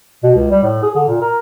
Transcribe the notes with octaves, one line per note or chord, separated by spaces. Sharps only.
B2
C#2
G3
A2
G#4
D3
A#2
A#4